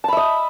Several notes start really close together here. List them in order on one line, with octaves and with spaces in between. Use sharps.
A5 B5 E5 D#5